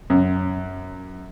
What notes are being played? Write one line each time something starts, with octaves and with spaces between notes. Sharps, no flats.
F#2